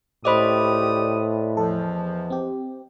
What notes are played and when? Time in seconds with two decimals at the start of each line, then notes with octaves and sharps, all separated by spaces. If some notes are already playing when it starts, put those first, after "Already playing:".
0.25 C#2 A2 G4 C5 D5 D#5 B5 D#6
1.57 E2 F3 A4
2.30 C4 G4